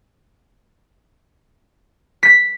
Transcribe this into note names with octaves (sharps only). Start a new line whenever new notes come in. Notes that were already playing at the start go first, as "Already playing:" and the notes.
B6